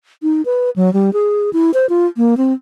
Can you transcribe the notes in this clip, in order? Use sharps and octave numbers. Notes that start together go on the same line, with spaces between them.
D#4
B4
F#3
G3
G#4
E4
C5
F4
A#3
C4